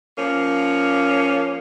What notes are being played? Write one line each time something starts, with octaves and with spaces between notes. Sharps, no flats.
F3 A#3 C#4